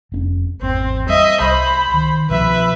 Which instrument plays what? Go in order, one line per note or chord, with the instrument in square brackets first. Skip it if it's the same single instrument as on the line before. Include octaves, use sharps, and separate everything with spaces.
[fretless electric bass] F1 C4 C#4
[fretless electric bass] G#1 E2 [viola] C4
[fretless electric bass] G3 [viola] D#5 E5
[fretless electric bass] C2 [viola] C5 B5
[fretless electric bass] D#3
[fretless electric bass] C2 B2 F3 [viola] B4 E5